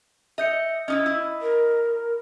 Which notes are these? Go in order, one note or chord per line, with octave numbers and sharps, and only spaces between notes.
D#5 E5 G6 C#7
C#4 D#4 E4 D#5 D#6
E4
A#4